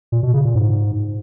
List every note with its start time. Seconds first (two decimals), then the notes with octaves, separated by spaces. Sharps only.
0.12 A#2
0.23 B2
0.34 C#3
0.44 A#2
0.55 G#2